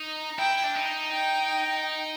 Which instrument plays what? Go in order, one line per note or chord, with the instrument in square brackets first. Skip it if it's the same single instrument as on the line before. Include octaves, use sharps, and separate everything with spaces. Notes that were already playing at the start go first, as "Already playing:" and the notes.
Already playing: [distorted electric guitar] D#4
[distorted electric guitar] E4 [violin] G5
[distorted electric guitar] D4
D#4
[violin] G5